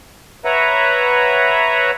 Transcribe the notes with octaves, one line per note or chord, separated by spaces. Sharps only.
B4 C#5 E5 F#5 A#5